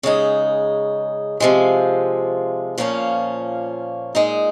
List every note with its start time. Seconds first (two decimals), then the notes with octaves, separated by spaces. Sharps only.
0.03 C#3 G#3 D#4
1.40 C3 F3 G#3
2.78 A#2 F3 A#3 C#4
4.15 A#2 G#3 D#4